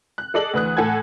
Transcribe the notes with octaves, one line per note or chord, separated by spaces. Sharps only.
F#6
G#4 A4 D5 D#5 F#7
D2 E3 D#6 F#6
A2 A4 F#5 G#5 G#6